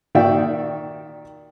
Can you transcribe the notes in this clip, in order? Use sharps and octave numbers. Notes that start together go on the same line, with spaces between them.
A#2 D#3 F#4 D5 E5 G5